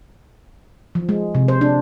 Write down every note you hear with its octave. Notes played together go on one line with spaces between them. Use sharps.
F3
G#3
C3
C5
D4